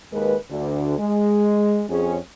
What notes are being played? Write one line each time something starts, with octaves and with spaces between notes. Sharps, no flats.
D#2 G#3 A#4 B4
D2 D3
G#3
F2 C#4 G#4